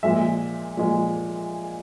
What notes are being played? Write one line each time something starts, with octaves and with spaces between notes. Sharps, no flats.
A#2 F3 G#3 E5
A#2 F3 G#3